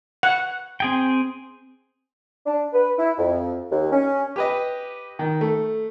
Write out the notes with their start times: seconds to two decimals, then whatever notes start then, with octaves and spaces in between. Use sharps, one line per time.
0.23 F#5
0.80 C4 G#4 G5
2.46 D4
2.73 B4
2.98 E4
3.18 F2
3.71 D#2
3.92 C#4
4.36 G4 B4 D#5
5.19 D#3
5.41 A3